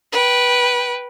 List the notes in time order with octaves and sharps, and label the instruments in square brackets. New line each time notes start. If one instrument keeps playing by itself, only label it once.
[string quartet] B4 G5